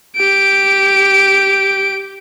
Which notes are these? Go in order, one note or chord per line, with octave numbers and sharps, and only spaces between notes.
G4 D7